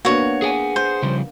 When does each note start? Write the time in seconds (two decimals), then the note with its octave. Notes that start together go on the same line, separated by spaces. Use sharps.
0.05 A#3 B3 D4 F#4 C#5
0.42 G#4 F#5 G#5
0.76 C5
1.03 C#3 F3 G3